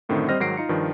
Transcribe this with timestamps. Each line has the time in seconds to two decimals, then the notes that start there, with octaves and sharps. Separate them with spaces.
0.09 F#2 A2 D3 D#3 C4
0.29 G3 C4 C5 D#5 F6 A#6
0.40 G#2 D#3 F#3 A#6 C7 D7
0.57 D#4 F4 C#7
0.69 G2 D#3 F3